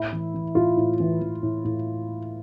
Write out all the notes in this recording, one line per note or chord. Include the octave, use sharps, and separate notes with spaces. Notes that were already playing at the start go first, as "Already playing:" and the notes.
Already playing: A2 E4
E3
E3
A2 F4
A2
E3
E3
A2
A2